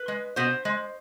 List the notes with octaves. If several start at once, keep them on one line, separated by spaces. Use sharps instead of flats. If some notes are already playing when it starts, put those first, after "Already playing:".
Already playing: B4
G#3
B2 C5
G#3